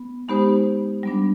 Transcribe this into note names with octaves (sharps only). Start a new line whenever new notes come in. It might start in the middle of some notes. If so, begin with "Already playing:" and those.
Already playing: B3
G#3 B3 D#4 G4 C5
G3 B3 D4